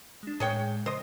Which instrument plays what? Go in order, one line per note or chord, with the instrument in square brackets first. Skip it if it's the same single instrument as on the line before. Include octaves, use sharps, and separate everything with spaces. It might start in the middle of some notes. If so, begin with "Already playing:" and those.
[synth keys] G#3 D4
[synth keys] A2 G#3 [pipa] G#4 C#5 G5
[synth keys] C#3 F3 C6 [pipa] C5 D#5